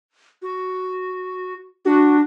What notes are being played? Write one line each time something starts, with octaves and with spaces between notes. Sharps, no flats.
F#4
D4 F#4